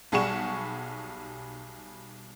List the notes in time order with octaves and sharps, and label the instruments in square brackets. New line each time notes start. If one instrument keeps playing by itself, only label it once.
[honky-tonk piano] B1 G3 G#4 F#5 C#6 E7